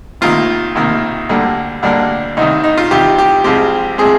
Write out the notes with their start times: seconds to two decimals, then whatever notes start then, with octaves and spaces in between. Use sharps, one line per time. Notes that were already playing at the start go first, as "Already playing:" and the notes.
0.21 C2 C3 D#3 A#3 F4
0.75 C2 C3 D#3 A#3
1.29 D2 D3 G3 A#3
1.83 D2 D3 G3 A#3 D4
2.37 C2 C3 D#3 D#4
2.64 D#4
2.78 F4
2.91 C2 C3 D#3 G4
3.18 G4
3.44 C2 C3 F3 G#3 C4 G4
3.98 C3 F3 G#3 C4 G#4